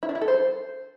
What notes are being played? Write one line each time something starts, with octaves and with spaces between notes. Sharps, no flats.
E4
D4
E4
A4
C5